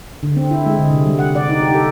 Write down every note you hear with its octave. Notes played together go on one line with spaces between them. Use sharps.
D3
C4
E4
G#3
D3
C3
G3
F#5
D5
D#4
G4
A4